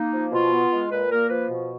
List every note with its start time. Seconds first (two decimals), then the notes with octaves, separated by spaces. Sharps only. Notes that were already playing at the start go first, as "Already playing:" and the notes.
Already playing: A#3 D#4
0.13 F3
0.32 B2 F4
0.52 B3
0.71 G#3
0.91 A#2 B4
1.11 A#3 A#4
1.30 F3 B4
1.49 B2